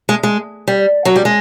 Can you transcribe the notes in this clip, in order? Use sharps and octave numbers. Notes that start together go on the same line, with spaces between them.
G#3
G#3
G3
F#3
G3
G#3